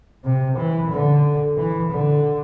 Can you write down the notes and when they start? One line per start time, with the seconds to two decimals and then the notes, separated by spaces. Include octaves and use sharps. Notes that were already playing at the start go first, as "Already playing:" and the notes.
0.24 C3
0.57 E3
0.90 D3
1.57 E3
1.90 D3